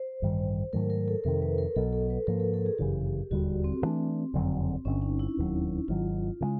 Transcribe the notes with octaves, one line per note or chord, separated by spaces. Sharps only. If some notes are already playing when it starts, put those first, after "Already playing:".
Already playing: C5
A1 G2 D#3 G3
G#2 D#3 F#3 A3 A#4
A#4
A4
F2 C3 D#3 A#4
B4
A#4
B1 B2 F#3 A4
A4
B4
G#2 F3 A#3 A#4
A4
A4
G#4
G1 F#2 C#3 E3 G4
E1 D#2 D3 G3 F#4
C4
G2 E3 A3 D4
F#1 F2 D3 F#3
G1 G2 D3 C#4
D#4
E4
E1 D#2 D#3 F#3
G#1 G#2 D#3 F#3 F4
C#3 E3 G#3